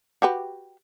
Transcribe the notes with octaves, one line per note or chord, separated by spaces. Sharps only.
F#4 G4 B4